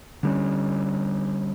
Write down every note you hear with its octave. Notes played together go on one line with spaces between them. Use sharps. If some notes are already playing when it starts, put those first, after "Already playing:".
D3 G3 C#4